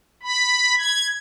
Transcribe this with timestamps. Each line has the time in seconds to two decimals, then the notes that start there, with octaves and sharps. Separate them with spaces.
0.23 B5
0.78 G#6